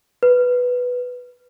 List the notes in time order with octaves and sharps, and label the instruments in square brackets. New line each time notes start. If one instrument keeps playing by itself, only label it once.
[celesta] B4